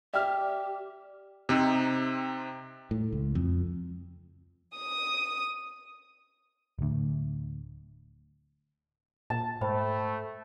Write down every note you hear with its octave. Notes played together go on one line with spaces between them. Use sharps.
G4 D5 E5 G5 F6
C3 C4 D#4
A2
C#2
F2
D#6
D1 D2
A#2 A5 E7
G#2 A3 C5 G5 B5